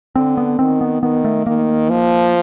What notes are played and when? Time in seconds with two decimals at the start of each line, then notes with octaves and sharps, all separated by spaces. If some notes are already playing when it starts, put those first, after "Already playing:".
0.16 D3 C4
0.37 B3
0.59 D#3 C4
0.81 B3
1.02 D#3 B3
1.25 A3
1.46 D#3 A#3
1.90 F3